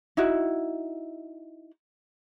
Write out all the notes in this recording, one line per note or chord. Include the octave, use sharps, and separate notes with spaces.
D#4 E4 F#4